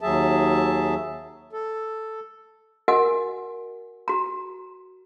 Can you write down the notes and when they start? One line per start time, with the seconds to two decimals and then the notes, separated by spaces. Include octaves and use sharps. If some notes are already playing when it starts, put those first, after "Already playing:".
0.01 D#2 F#3 G#4 E5 A5
1.53 A4
2.88 F#4 A#4 D#5 F#5 G#5
4.08 F#4 A#5